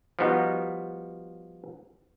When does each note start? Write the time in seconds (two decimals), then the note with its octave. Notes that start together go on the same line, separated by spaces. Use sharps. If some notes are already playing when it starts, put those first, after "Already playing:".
0.19 F3 G3 B3 D#4 F#4